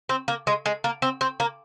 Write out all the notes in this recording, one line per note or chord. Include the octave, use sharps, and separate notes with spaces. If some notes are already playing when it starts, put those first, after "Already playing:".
C4
A#3
G#3
G#3
A#3
C4
C4
A#3